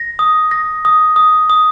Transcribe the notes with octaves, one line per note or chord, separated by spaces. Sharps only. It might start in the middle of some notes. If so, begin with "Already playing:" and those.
Already playing: A#6
D#6
A#6
D#6
D#6
D#6